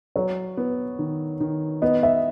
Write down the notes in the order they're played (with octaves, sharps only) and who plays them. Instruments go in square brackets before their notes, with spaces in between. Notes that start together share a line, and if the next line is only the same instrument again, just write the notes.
[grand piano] F#3 [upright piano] C#5
[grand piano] B3
D#3
D#3
[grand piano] B3 [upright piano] D#5
[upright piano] E5